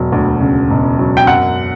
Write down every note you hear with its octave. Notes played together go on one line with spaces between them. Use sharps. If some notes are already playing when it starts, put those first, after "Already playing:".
Already playing: E1 F#3
D2
C#3
E1
F#3
G5
F#2 F#5